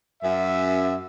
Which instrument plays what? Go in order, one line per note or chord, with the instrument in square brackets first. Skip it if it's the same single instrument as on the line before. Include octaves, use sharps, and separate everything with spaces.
[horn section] F#2 E5